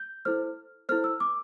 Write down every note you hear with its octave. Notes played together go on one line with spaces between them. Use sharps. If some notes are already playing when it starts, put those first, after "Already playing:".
Already playing: G6
E4 A4 C5 F6
E4 A4 C5 F6
E6
D6